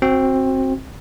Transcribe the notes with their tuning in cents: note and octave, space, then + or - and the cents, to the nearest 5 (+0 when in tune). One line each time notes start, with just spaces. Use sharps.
C4 +15 F#4 +0